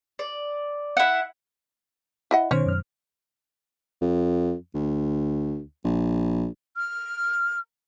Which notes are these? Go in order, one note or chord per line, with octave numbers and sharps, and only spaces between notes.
D5
E4 F#5
E4 D#5 F#5
B2 D#3 C#4 C5 C#5
F#2 F6
F2
D2
A#1
F6